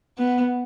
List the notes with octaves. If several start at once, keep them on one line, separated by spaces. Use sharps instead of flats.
B3